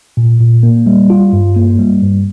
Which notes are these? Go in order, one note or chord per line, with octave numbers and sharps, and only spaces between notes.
A#2
A#2
A#3
G3
F4
G2
A#3
G3
G2